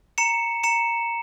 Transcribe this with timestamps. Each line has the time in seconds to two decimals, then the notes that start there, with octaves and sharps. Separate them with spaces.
0.18 A#5 C#7 E7
0.63 A#5 C#7 E7